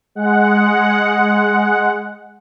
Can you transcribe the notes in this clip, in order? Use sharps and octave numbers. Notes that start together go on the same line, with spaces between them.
G#3 F#5